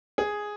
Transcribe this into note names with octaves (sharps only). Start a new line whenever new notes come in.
G#4